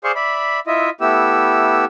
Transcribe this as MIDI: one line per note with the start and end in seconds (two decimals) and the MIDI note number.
0.04 0.12 68
0.04 0.12 72
0.04 0.12 74
0.04 0.12 77
0.04 0.12 84
0.04 0.12 85
0.16 0.60 74
0.16 0.60 76
0.16 0.60 83
0.67 0.90 64
0.67 0.90 65
0.67 0.90 75
0.67 0.90 76
1.01 1.85 57
1.01 1.85 59
1.01 1.85 64
1.01 1.85 67
1.01 1.85 88